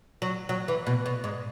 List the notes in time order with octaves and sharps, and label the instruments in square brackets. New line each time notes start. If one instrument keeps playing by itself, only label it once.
[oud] F#3
F#3
E3
B2
B2
G#2